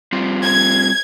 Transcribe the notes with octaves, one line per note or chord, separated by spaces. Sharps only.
G3 C4 F4
G#6